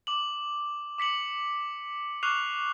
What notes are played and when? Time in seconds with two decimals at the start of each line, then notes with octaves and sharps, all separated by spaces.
0.07 D6 F#7
0.98 D6 B6 C#7 F#7
2.23 C#6 D6 F6 F#6 C7 F7